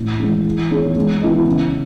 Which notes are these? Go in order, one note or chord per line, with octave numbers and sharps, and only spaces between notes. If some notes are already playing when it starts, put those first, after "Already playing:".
Already playing: A2
E3 G#3
E3
B3 D#4 G#4 C#5
G#3
B3 E4 B4 D#5
C#3